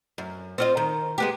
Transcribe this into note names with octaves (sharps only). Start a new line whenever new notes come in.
F#2
C4 F4 D#5
D#3
G#3 B3 G4